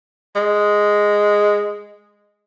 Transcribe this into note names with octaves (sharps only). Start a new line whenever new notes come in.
G#3